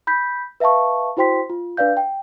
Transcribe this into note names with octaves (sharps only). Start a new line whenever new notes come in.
B5 G6 B6
B4 E5 F5 A5 C#6
E4 F#4 C5 G5 C6 B6
F4
D4 B4 D5 F5 G6
G5